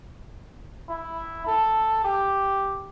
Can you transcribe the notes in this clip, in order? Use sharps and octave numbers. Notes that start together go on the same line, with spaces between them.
E4
A4
G4